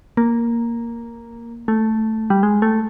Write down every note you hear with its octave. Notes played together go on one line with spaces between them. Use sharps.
A#3
A3
G3
G#3
A3